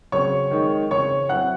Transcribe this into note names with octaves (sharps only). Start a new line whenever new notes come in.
C#3 F#3 C4 C#5 C#6
D#3 G#3 D#4
C#3 E3 C4 C#5 C#6
F#3 C4 E4 F#5 F#6